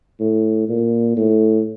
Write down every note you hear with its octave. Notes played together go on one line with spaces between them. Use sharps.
A2
A#2
A2